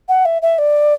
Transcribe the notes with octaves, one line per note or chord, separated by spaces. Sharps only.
F#5
E5
E5
D5